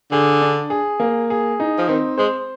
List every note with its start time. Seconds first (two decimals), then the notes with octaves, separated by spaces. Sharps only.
0.11 D3 G#4
0.42 D4
0.70 G#4
1.00 A#3
1.30 G#4
1.60 D#4
1.78 F3
1.89 D#3 C4
2.18 G#3 C5